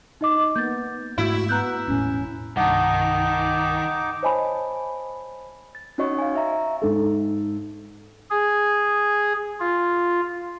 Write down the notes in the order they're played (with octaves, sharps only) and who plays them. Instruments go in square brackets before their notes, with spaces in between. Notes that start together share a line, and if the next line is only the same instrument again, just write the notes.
[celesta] D#4 D#5 D6
[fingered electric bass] A#3 [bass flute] B3 [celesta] G6 A6
[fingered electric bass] G#2 G#3 A3 [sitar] E4 [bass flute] F#4
[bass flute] B3 [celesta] A#5 F#6 G6
[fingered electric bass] E1 A2 [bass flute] C#4
[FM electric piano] C2 G2 [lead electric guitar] D#3 [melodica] D#4 D6 [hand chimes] F#5 A5
[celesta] C5 C#5 D#5 G#5 A5 B5
[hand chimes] A6
C#4 D#4 F#4 C#5 D#5 C#6
F5 G#5
E5 A#5
[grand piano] G#2 A4
[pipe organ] G#4
F4